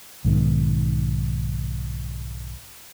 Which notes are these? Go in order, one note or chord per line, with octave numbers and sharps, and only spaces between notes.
B1 G#2 D#3